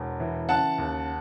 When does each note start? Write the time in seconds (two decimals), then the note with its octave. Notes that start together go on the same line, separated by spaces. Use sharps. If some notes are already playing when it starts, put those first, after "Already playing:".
Already playing: E1 E2
0.20 E3
0.49 C#3 F#5 A5
0.78 D#2